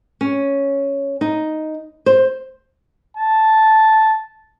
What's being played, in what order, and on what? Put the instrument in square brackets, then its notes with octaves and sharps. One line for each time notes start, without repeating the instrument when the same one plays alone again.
[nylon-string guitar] C#4
D#4
C5
[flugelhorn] A5